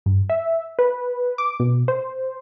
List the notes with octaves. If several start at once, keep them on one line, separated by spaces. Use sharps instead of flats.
G2
E5
B4
D6
B2
C5